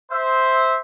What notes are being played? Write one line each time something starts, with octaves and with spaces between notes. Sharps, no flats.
C5 E5